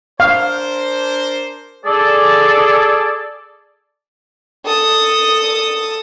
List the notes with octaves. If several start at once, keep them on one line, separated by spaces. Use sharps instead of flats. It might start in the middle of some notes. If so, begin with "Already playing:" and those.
D4 A#4 C5 F5
G#4 A4 D5
A4 D#6